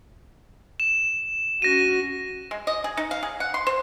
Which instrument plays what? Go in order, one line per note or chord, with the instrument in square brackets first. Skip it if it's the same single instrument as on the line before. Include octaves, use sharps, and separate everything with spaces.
[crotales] E7
[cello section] C#4 F#4 [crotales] A#6 D#7
[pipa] G#3
D#5
G#4
D#4
F5
G#4
F#5
C6
C5